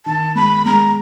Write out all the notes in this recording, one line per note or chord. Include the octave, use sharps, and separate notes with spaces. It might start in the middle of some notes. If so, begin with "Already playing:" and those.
D#3 A5
G#3 B5
G#3 A#5